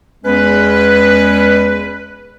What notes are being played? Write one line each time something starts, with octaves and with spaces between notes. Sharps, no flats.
E2 G#3 C#4 B4